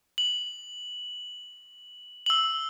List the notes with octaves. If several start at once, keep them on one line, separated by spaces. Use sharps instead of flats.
F#7
E6 F#7